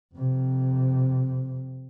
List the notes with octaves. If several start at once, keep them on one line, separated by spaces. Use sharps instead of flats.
F2 C3